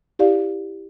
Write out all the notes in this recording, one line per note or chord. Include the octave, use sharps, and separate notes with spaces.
E4 G4 D5 F5